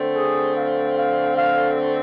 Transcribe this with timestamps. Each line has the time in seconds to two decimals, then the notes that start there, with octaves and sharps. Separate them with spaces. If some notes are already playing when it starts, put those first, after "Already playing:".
Already playing: D3 A3 C4
0.15 G#4
0.56 F5
0.96 F5
1.36 F5